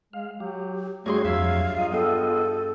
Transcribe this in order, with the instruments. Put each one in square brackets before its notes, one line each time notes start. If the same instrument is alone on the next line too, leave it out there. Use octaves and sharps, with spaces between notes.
[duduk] G#3 [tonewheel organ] F5
[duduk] F#3 [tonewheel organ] G4
[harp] G2 G#4 C6 [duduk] A3 [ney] F#4 [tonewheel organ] C#5 G#6
[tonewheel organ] F2 G#6 [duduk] F#3 [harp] E5 E6 [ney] F5
[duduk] F#3 [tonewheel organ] F4 D#5
[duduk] B3 [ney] A4 [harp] G5